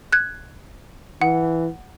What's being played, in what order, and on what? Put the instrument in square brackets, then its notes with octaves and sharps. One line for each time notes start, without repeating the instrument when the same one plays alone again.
[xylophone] F#6 G#6
[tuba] E3 [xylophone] F#5